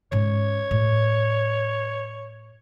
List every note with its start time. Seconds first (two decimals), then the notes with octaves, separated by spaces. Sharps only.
0.12 G#2 C#4 C#5
0.71 A2